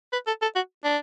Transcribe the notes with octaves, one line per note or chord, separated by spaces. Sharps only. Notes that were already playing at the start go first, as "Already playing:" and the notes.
B4
A4
A4
F#4
D4